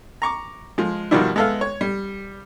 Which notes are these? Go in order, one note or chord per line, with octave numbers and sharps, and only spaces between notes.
A#5 C#6 D6
F3 G#3
B2 D#3 F3 G3 D4 E4
G#3 B3 A4 E5 F5
C#5
G3